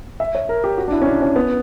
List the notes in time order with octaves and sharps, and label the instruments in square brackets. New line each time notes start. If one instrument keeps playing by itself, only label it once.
[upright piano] E5
C#5
A#4
G4
F#4
D4
E4
C#4
D4
C#4
B3